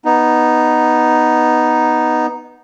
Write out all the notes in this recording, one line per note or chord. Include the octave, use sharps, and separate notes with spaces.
B3 D#4